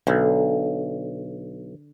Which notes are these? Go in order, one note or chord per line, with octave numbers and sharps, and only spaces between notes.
B1 D3